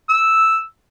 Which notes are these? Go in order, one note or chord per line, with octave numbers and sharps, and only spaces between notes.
E6